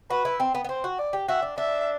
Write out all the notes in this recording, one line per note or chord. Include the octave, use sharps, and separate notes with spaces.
F#4 B4
E4
C4
B3
B3
C4 C5
F#4
D5
G4
F#4 E5
D4
D4 E5